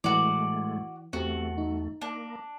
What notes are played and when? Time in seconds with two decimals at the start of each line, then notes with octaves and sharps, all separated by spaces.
0.04 A2 E3 G#3 A3 F#4 D5
1.13 E2 A3 C4 F#4 G4
1.58 D#4
2.02 A#3 D4